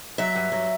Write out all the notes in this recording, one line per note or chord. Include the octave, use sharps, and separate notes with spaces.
F#3 E5
G2
F#3